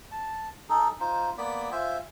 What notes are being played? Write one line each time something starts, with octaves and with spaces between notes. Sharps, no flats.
A5
D#4 G#4 A4
D#4 F4 C5
A#3 B3 D5 B5
F4 C5 E5 G#5